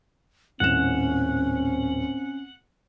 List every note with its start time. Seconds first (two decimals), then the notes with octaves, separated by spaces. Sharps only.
0.60 D#1 A2 C4 C#4 F#5 E7